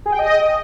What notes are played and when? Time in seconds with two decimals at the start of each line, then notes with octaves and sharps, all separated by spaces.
0.06 G#4
0.12 G5
0.19 D#5